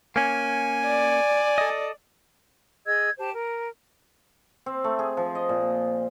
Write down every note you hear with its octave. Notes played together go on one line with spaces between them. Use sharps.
A#3 C#4 G#5
D5
A4 D#5
G#4 D#5 E6 G#6
G4 C5 A5
A#4
C4
A3
G#4
F3
D#5
A#2